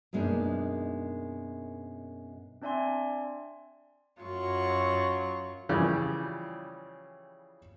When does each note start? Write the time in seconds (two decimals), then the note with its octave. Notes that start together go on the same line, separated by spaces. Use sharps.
0.13 F#2 B2 G#3 A#3 D4 D#4
2.62 C4 D4 D5 E5 G#5 C6
4.20 F#2 F#3 F4 C#6
5.69 C#3 E3 F3 G3